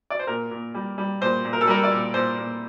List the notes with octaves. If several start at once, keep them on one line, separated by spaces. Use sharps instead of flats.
D5
C5
A#2 A#4
A#2
G3
G3
A#2 C5
A#2
A#4
A4
G3 A#4
D5
A#2
A#2 C5
A#2